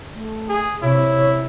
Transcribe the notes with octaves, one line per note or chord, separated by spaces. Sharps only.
A3
G#4
C3 E4 C#5